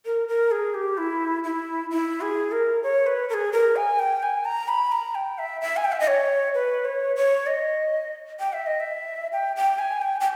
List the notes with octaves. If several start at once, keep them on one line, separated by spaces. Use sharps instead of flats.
A#4
A#4
G#4
G4
E4
E4
E4
G#4
A#4
C#5
B4
A#4
G#4
A#4
G#5
G5
G#5
A#5
B5
A#5
G5
E5
E5
G#5
G5
E5
D#5
C#5
B4
C#5
C#5
D#5
G5
E5
D#5
E5
G5
G5
G#5
G5
G5